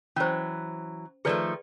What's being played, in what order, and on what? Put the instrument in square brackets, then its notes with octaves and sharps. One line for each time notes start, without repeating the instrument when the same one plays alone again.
[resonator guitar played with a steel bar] E3 F#3 [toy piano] C#4 C5
[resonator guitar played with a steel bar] D#3 F3 A3 [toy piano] G#4 B4 D5